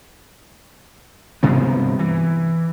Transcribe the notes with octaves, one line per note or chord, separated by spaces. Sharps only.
G2 C3 B3
E3